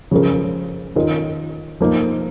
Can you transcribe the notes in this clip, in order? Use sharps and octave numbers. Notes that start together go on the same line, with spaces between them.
C#3 F3 G#3 C#4 A#4
D#3 C#4 F4 A#4 D#5
F3 A#3 D#4